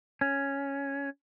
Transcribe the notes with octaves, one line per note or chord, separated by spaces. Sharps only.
C#4